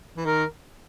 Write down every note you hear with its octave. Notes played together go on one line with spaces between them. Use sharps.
E3
D#3 A#4